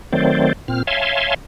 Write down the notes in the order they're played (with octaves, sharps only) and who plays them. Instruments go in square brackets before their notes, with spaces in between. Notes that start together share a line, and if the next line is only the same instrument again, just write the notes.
[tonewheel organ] D#3 F#3 A3 C4 C5 D5
A#2 C4 F6
C#5 E5 F5 G#5 A5 C6